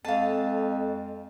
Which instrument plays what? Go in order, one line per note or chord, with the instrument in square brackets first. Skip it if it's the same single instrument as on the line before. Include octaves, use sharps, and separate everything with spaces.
[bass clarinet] F2 [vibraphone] G#3 A4 D#5 [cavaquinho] F5 A5